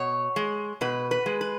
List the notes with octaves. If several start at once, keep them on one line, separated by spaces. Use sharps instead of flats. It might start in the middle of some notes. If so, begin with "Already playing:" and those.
Already playing: B2 C#5
G#3
B2 B4
B4
G#3
B4